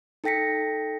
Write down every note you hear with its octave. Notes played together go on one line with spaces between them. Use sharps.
D#4 A4 G5 A#6 B6 C#7